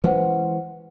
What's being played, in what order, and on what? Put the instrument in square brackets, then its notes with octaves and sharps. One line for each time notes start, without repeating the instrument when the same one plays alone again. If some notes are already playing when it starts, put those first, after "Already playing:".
[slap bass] E3 G#3 C#4 [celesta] B4 C5 F#5